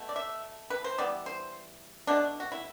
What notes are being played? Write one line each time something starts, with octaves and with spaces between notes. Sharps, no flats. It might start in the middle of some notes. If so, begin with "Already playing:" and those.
Already playing: B2 A3
D5
E5
B4
C5
E3 G3 B3 D5
C5
B2 A3 D4
F#4
E4